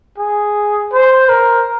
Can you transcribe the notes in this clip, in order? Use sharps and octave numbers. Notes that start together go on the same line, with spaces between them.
G#4
C5
A#4